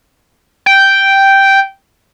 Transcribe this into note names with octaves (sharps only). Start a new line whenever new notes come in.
G5